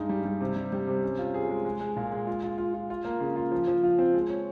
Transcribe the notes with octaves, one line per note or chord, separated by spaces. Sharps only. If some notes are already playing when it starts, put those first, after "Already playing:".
Already playing: G2 G#3 D#4
G3
G3
C3
G3
G3
C3
C#4
F4
G#4
G#3
G#3
G#3
A#2
G#3
F4
F4
F4
F4
F4
A#3
C#3
F4
F3
F3
F4
C4
G#3
C#5